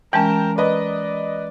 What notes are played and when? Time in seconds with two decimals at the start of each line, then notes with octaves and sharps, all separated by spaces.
0.13 E3 G#3 C#4 A#4 G5 A5
0.58 B4 D5 D#5